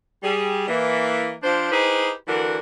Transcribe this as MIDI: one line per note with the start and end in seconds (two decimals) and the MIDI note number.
0.23 0.67 55
0.23 0.67 68
0.68 1.34 52
0.68 1.34 58
1.43 1.70 53
1.43 1.70 62
1.43 1.70 67
1.43 1.70 72
1.72 2.10 63
1.72 2.10 64
1.72 2.10 67
1.72 2.10 68
1.72 2.10 71
1.72 2.10 72
2.27 2.58 50
2.27 2.58 52
2.27 2.58 58
2.27 2.58 62
2.27 2.58 66
2.27 2.58 70